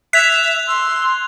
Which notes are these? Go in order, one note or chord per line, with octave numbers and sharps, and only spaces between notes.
E5 F#6 G#6 B6 F7
C6 E6